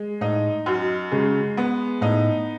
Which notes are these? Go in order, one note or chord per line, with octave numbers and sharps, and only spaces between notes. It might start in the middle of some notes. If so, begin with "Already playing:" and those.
Already playing: G#3
A2 D#4
F#2
C#3 G#3
B3
A2 D#4